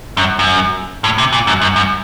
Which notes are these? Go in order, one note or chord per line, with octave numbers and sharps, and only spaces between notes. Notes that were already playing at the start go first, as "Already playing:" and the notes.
F#2
F#2
A2
C3
A#2
F#2
F#2
F#2